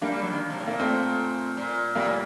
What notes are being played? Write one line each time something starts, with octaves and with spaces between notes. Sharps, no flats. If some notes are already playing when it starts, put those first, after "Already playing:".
G3 A#3 D4
G3
F#3
D#3
C3
A2
A#2 A#3
A3 C4
A#2
A#2 G3 A#3
A2